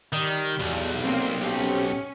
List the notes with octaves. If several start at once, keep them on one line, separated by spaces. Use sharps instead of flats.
D#3 G3
B1 E2
A#3 C4
C4 C#4 G4